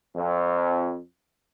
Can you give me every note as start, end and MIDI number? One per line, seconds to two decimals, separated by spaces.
0.15 0.98 41